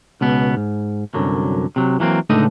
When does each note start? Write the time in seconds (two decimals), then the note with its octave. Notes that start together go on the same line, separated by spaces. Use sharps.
0.21 C#2 B2 B3
0.57 G#2
1.14 C2 F#2 D3 F#3
1.76 C3 F#3
2.00 E3 F#3 A#3 C4
2.30 C#2 A2 D3 A3 D#4 D#5